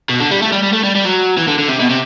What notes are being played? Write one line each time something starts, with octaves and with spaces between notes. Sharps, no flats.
B2
D3
G3
A3
G3
G3
A3
G3
G3
F#3
E3
D3
D3
C3
B2
C3